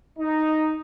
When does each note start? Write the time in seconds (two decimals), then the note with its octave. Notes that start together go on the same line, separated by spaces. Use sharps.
0.19 D#4